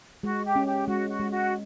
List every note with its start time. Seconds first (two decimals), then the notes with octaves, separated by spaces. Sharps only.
0.23 G#3 F#4
0.44 G4
0.56 C#4
0.67 G4
0.87 G#3 F#4
1.09 F#4
1.19 G#3
1.31 F#4